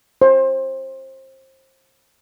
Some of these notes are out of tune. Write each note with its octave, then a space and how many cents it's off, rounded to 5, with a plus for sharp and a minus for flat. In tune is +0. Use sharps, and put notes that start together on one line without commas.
C5 +25